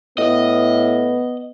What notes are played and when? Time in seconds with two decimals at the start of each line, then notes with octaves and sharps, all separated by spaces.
0.18 A2 B3 D#5